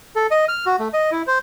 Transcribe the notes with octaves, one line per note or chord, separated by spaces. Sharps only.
A4
D#5
F6
F#4
A3
D#5
E4
C5